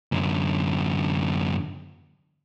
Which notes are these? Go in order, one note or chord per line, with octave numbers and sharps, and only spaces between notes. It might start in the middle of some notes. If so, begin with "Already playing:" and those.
F#2 D3